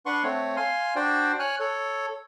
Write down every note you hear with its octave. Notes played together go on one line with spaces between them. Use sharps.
D4 B4 F#5 C6 C#6
A3 C4 C#5
F5 G#5 C6
D4 F#4 C5 D5 G5
C#5 G#5 F6 F#6
A4 C#5